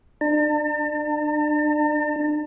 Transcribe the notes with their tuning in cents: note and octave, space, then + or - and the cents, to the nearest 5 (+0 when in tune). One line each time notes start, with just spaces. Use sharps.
D4 +35 A5 +40